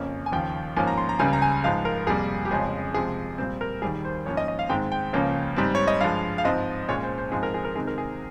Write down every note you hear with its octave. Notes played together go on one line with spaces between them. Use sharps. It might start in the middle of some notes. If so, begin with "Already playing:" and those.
Already playing: F2 C#3 F3 A#3 C#4
G#5
D#2 C#3 F3 G5
G#2 F3 A#3 C#4 G#5
A#5
C6
A#5
C#2 C#3 G3 G#5
A#5
G#5
G#2 F3 G#3 F5
A#4
F2 C3 G3 A#3 G#4
G4
F2 C#3 F3 G#3 C#4 G#4
C3 F3 G#3 G#4
A#2 G3 C4 C5
A#4
D#2 D#3 G3 G#4
C5
G#2 F3 A#3 C#4 C#5
D#5
D#5
F5
G#2 D#3 G#3 C4 G5
G5
C#2 C#3 F3 A#3 C#4
G#2 G3 C4
C#5
D#5
G2 F3 G#3 F5
F5
G#2 F3 C4 D#5
A#2 G#3 C#4 C#5
C5
C5
G#2 F3 G#3 C4 G#4
A#4
G#4
A#4
C3 D#3 G#3 C4 G#4
A#4
G#4